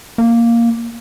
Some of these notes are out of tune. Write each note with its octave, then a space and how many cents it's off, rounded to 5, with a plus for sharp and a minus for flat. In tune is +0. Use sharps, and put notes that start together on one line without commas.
A#3 +0